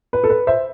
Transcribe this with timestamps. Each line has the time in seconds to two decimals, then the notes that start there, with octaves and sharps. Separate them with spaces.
0.13 B4
0.24 A4
0.30 B4
0.47 C5 E5